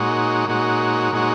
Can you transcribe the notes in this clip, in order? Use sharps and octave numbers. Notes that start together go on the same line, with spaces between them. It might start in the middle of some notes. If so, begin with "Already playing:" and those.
Already playing: A#2 G#3 D#4 F#4 C#5
A#2 G#3 D#4 F#4 C#5
A#2 G#3 D#4 F#4 C#5